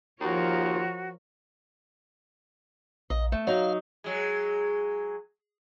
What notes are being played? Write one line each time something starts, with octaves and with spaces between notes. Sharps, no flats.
D#2 F3 F4 F#4 A#4 C#5
A#1 D#5
A3
F#3 D#4 F5
F#3 G#3